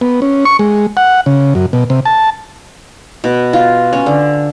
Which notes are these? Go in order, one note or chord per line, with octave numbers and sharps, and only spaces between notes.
B3
C#4
C#6
G#3
F#5
C#3
F#2
B2
C3
A5
B2
F4
C#4
D3